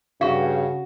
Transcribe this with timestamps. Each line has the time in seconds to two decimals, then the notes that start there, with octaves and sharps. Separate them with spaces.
0.21 G2 C#3 F#4 F5 C#6